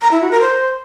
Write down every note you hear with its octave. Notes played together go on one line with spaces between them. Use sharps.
A#5
E4
F#4
A#4
C5